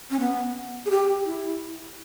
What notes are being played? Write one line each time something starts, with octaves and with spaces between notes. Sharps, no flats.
C#4
B3
G#4
G4
E4